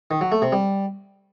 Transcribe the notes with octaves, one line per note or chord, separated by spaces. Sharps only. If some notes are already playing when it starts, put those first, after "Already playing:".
D#3
F#3
A3
C3
G3